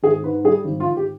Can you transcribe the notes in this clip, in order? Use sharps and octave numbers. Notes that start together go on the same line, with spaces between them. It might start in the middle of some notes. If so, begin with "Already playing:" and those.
G#1 G#4
G#2 B4
G3 G#4
G#1
F4
G#1
G4